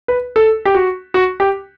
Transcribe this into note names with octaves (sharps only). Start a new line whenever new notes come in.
B4
A4
G4
F#4
F#4
G4